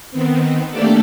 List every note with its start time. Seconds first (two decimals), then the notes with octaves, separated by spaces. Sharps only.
0.11 D#3 B3 C4
0.70 A3 A#3 D4 G4 A4 D5